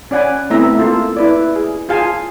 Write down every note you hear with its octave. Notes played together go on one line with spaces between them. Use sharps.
C#4 D5 F#5 G#5 B5
A3 B3 C4 E4 E5 A#5
A#3 F4 A4
E4 B4 D5
G#4
F4 G#4 F5 G#5 A5